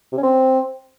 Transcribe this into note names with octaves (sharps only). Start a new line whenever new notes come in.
C3
C#4
C4